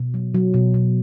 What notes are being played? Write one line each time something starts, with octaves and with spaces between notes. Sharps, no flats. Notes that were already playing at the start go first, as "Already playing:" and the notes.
Already playing: B2
F#3
F#3
B2
B2